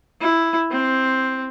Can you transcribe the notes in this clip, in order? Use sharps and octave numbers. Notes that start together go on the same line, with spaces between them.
E4
C4